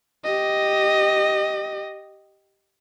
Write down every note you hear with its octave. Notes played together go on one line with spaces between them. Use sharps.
G4 D#5